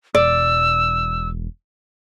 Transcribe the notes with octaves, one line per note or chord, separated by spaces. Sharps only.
E1 D5 E6